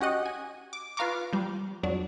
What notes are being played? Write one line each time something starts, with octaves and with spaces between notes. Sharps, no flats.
C#4 F#4 G4 D#5 F#5
G#5
D6
F4 B4 F5 A#5 C#6 D6
F3 G3
F2 F#3 D4